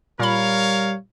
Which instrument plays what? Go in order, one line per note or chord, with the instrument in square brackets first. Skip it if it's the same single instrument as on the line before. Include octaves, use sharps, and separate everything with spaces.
[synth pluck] A#2 B5 [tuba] G3 [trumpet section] A#4 C#5 F5